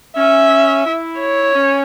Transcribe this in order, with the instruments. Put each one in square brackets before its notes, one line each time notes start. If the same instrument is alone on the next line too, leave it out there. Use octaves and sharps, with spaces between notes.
[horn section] C#4 [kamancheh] E5
[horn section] E4
[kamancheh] C#5
[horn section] C#4